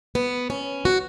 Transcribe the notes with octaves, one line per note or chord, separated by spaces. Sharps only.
B3
C#4
F#4